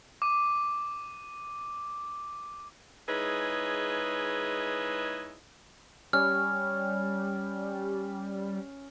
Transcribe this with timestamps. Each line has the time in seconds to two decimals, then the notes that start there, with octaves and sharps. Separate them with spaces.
0.22 D6 D#7
3.09 G#3 D#4 E4 G#4 B4 C#5
6.13 G3 C#4 F6